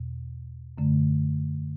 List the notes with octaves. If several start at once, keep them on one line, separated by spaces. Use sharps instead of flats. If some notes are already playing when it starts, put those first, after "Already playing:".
Already playing: E2 B2
F#2 D3 A3